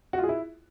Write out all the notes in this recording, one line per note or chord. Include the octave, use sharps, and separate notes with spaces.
F#4
F4
G#4
E4